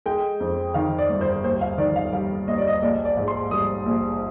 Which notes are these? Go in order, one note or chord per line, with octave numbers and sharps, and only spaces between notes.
G#3 G5
F2
D#3 F5
D5
G1
C5
D#2 C5
F5
D#3 D5
F5
G3 F5
D#2 D#5
D5
D#5
A#1 D5
D5
G#2
C6
G3 D#6
A#1